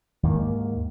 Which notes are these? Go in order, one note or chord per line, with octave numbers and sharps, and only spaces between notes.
D#2 G#2 D#3 A#3